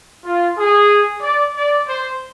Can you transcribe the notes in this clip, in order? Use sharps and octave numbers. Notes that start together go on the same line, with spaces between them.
F4
G#4
D5
D5
C5